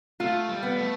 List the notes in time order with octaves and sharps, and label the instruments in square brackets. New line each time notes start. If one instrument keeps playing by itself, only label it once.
[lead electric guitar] A3 [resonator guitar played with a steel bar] F4
[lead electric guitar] G3
[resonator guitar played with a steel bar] B3
[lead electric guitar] A3